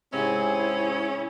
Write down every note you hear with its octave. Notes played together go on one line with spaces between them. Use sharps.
G#2 C3 C4 C#4 E4 G#4